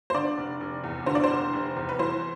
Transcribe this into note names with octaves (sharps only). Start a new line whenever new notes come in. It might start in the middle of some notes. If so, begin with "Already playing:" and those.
C5
D3 D5
F1
F1
E2
D3 C5
D5
C5
F1
F1
E2
B4
E3 C5